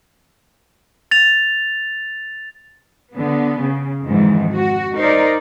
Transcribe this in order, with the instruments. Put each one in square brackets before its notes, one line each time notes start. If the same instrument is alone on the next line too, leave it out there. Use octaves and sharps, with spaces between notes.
[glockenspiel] A6 F7
[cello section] D3 B3
C#3
F2 G#2 D#3 E3
F#4
D#4 A#4 C5 D5